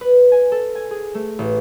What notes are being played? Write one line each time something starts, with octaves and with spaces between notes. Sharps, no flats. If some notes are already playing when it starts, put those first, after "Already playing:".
B4
G#5
A4
G#5
G#4
A3
A1